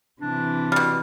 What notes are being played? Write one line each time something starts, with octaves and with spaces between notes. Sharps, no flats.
C3 E3 D4
B2 G3 F6